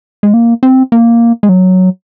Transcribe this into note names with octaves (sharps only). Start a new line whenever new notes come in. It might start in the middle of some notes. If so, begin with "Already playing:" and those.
G#3
A#3
C4
A#3
G#3
F#3